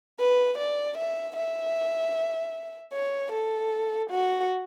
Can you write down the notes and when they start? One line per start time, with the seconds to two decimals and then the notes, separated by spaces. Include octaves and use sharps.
0.20 B4
0.58 D5
0.98 E5
1.36 E5
2.93 C#5
3.32 A4
4.10 F#4